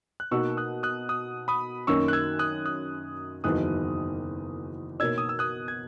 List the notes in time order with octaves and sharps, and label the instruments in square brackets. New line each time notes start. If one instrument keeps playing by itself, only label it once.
[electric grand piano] F#6
[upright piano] B2 A#3 D#4 F#4 [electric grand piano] C#6 E6
[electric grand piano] D#6 F#6
D#6 F#6
D#6 F#6
B5 D#6
[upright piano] F#2 D#3 A#3 C#4 [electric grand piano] C#6 E6
[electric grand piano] F#6
E6 G#6
D#6 F#6
D#6 F#6
[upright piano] F#1 E2 D#3 F#3 B3 [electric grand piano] D#6 F#6
[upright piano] B2 A#3 D#4 A#4 C#5 [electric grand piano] E6 G#6
[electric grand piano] D#6
E6
D#6 F#6
G#6